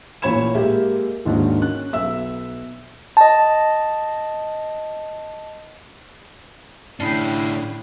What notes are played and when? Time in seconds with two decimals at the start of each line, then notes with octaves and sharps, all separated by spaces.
0.22 A1 A#2 C#5 B5 G#6 E7
0.55 G#3 A#3 G4 E5
1.25 D#2 G#2 D#3 A#3 D4 F#4
1.62 C#4 F#6
1.93 B1 E5 E6
3.17 D#5 A5
7.00 A2 D3 C#4 D4 E4 G5 B5 C7